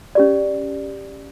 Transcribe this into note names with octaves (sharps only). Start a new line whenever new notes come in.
C#4 G4 D5